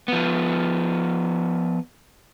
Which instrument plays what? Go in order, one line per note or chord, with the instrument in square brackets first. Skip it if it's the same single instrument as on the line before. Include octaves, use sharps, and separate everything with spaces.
[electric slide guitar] F3 B3